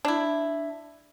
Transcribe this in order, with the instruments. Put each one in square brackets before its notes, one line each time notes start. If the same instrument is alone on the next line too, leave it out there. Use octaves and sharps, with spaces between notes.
[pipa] D4 E4